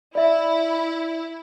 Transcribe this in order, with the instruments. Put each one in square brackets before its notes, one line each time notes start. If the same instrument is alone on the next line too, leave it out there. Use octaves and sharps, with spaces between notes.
[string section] E4 [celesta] D5 E5